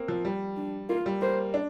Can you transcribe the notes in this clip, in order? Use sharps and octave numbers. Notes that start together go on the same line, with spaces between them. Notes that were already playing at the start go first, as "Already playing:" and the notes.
Already playing: A#3 C4
F3
G3
D4
A#3 F4
G3
A#3 C5
D4